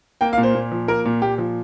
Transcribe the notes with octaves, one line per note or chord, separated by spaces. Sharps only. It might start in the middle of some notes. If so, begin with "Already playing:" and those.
A#3 G5
F5
A#2
C5
A#2
F3
A#3 A#4
A#2
A#2 G4
F3